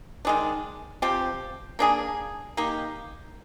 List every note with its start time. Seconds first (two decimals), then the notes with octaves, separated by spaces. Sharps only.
0.25 D#3 G#3 D4
1.02 F3 C4 G4
1.79 A#3 D4 G#4
2.57 A#3 D#4 G4